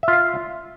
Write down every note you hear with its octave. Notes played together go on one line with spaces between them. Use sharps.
F4 E5 F5